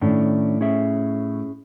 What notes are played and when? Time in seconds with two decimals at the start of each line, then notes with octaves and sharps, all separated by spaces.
0.02 A2 D#3 C#4 D4
0.61 C#4 G#4 E5